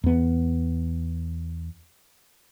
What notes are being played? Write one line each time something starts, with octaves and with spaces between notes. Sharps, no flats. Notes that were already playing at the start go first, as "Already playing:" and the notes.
E2 B3